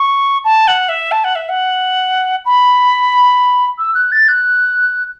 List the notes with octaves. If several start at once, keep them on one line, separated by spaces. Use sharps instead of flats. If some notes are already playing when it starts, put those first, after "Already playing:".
Already playing: C#6
A5
F#5
E5
A5
F#5
E5
F#5
B5
E6
F#6
A6
F#6